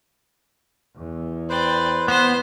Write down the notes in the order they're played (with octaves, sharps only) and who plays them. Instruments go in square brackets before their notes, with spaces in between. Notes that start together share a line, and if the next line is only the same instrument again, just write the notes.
[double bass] E2
[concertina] B4 C5 C6 [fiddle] D5 G5
[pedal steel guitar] B3 [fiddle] C5